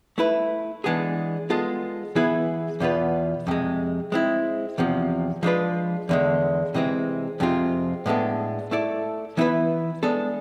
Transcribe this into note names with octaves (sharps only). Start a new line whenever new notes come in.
A3 E4 B4
E3 G#3 B3 D4 G#4
G#3 B3 F4 A4
E3 B3 E4 G#4 B4
E2 B2 B3 F4 B4
F2 C3 G#3
G#3 C4 E4
E2 C3 F3
F3 G#3 D4 F4 B4
E2 D3 G#3
C3 E3 G#3 C4
F2 C3 G#3 C4 F4
A2 G#3 B3 D4 A4
A3 E4 A4 D5
E3 B3 E4 B4 E5
G#3 B3 D4 A4